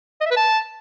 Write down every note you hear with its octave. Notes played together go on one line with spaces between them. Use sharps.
D#5
E5
B4
A5